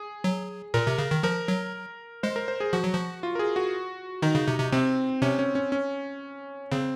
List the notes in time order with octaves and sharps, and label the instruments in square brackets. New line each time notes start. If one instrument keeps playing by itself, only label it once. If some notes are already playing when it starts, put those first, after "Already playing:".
Already playing: [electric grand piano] G#4
[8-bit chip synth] F#3
[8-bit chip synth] A#2 [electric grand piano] A#4
[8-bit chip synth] C3
C#3
D#3
[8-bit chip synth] F3 [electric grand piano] A#4
[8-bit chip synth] F#3
[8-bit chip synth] G#3 [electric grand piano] C5
[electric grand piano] A#4
C5
G#4
[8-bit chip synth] F3 [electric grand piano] F#4
[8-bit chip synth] F#3
F3
[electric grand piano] F4
A#4
G#4
F#4
[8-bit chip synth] D#3 [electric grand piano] D#4
[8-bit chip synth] C#3
C3
C3
[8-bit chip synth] C3 [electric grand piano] C4
[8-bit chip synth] C3 [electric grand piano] C#4
[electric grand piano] C#4
C#4
C#4
[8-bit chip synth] C#3 [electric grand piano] C4